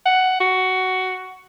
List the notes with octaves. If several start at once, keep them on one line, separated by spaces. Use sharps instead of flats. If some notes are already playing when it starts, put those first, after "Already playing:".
F#5
F#4